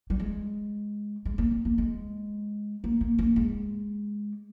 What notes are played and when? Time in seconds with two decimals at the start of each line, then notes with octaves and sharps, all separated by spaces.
0.10 G3
0.20 G#3
1.25 G#3
1.38 A#3
1.51 C4
1.65 A#3
1.78 G#3
2.84 A#3
3.01 A#3
3.19 A#3
3.36 G#3